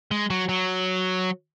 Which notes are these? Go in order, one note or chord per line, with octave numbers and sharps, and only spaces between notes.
G#3
F#3
F#3